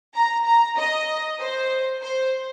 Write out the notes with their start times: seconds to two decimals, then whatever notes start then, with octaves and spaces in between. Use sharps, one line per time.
0.15 A#5
0.45 A#5
0.77 D#5
1.39 C5
2.02 C5